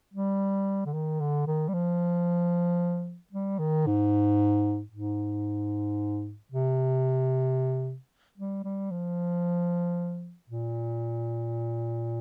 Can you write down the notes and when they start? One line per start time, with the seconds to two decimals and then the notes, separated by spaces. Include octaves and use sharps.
0.14 G3
0.86 D3
0.93 D#3
1.20 D3
1.47 D#3
1.69 G3
1.74 F3
3.33 G3
3.59 D#3
3.86 G#2
4.92 G#2
6.52 C3
8.38 G3
8.64 G3
8.91 F3
10.50 A#2